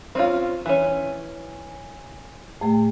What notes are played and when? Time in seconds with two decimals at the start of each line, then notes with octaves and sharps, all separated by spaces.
0.15 C4 C#4 F4
0.66 E3 C#4
2.61 A2 A3